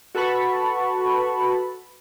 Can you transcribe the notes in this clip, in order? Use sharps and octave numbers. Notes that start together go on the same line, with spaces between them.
F#4 A4 B4 A5 B5 C#6